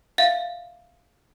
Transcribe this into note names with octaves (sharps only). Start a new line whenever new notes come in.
E5 F5